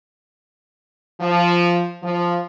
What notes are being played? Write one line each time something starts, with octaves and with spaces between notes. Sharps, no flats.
F3
F3